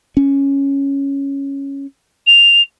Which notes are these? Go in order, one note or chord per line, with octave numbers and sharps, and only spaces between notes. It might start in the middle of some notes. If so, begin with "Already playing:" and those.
C#4
F7